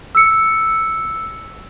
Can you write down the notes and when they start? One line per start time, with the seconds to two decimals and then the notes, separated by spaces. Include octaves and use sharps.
0.15 E6 C#7